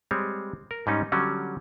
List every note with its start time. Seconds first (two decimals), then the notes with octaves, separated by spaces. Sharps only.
0.11 G3 G#3 C4 C#5
0.71 A#4
0.87 G#2 G3 C#4 D#4
1.12 D3 F#3 G3 C#4